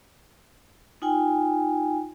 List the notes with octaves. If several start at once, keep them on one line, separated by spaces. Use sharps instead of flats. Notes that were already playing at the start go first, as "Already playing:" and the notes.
D#4 F4 G5 G#5